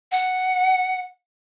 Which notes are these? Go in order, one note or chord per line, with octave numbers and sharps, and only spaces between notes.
F#5